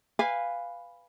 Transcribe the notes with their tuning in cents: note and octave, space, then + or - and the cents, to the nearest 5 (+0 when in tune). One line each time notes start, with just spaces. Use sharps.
B4 +0 F5 +0 G#5 -20